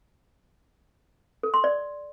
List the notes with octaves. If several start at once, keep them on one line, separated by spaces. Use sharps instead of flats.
A4
C6
D5